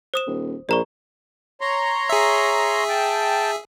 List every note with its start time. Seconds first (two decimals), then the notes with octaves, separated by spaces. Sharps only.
0.14 C5 D#6 E7
0.27 D#1
0.69 A#1 D5 A#5 C#6
1.61 C#5 A#5 C6
2.10 G#4 E5
2.89 G5 A5